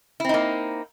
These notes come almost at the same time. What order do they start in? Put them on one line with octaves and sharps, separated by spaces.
E4 C4 D#4 A#3